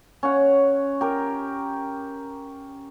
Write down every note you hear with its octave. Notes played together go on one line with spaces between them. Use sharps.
C#4 F#5
G4 A#4